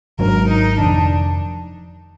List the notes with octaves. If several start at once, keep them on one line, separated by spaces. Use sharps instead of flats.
G#1 G#2 F#3 D4 A#4
D#4
F1 F2 D#3 D4